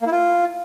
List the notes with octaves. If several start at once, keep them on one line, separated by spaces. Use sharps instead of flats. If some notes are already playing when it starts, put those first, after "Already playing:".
A#3
E4
F4